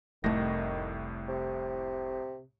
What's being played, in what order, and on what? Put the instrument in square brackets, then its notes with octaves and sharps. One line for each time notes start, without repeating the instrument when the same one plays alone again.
[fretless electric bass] F1 A3 [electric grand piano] C2 A2 A#6 [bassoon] D#3
[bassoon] C3